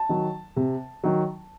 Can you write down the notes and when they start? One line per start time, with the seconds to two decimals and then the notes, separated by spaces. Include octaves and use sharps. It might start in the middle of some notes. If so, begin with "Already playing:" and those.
Already playing: A5
0.09 D#3 F#3
0.56 C3
1.03 D#3 F#3